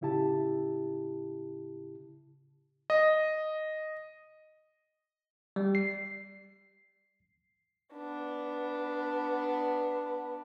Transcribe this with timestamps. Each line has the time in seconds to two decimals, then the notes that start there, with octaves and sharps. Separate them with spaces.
0.01 A2 C#3 E4 G4 A5
2.90 D#5
5.56 G3
5.75 C7
7.95 B3 D4